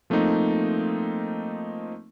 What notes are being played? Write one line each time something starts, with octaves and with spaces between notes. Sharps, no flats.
F3 A3 A#3 C4 D#4